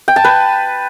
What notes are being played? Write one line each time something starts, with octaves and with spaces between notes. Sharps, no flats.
G5
A5
B4